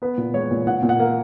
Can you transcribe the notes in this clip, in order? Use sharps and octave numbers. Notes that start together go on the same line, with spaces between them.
B3 B4
A#2
G#3 C#5
A#2
A#2 F#5
A#2
F#5
A#3